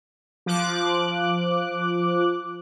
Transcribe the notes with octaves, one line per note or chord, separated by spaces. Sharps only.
F3 D6 F#6